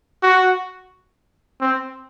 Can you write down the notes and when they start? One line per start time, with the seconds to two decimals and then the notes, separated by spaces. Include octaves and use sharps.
0.23 F#4
1.61 C4